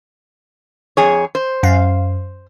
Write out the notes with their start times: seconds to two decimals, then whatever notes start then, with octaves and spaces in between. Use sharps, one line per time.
0.97 F2 G#4 C#5
1.35 C5
1.63 F#2 F5